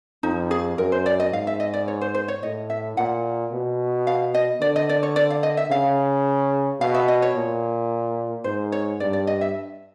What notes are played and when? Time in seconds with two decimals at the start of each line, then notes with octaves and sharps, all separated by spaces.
0.23 F2 D#4
0.51 G#4
0.77 F#2 A#4
0.92 C5
1.06 D5
1.20 D#5
1.32 G#2 F5
1.47 E5
1.60 D#5
1.74 D5
1.88 C#5
2.01 C5
2.15 C5
2.28 C#5
2.42 A2 D#5
2.70 E5
2.97 A#2 F#5
3.52 B2
4.07 F5
4.34 D#5
4.61 D3 D5
4.76 D#5
4.89 D5
5.03 C#5
5.16 D5
5.30 F5
5.43 D#5
5.57 E5
5.70 C#3 F5
6.80 B2 F5
6.94 E5
7.08 D#5
7.22 C#5
7.36 A#2
8.44 G#2 C5
8.72 C#5
9.00 G2 D5
9.13 D5
9.27 D#5
9.41 E5